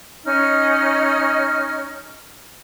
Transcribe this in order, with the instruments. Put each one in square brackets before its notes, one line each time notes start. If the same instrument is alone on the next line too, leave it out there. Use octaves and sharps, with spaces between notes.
[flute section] C#4 D#4 D#5 F6